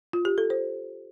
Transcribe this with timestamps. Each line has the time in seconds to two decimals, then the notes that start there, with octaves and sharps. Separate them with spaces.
0.13 F4
0.25 G4
0.38 A4
0.50 C5